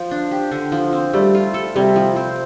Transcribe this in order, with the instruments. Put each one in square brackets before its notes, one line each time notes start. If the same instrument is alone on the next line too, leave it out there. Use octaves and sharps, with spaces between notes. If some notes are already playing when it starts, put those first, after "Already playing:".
Already playing: [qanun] F3 C5
D4
G4
D3
F3
C4
[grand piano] G3 [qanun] A3
[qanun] F4
A4
[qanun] C3 [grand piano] G3
[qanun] F3
C4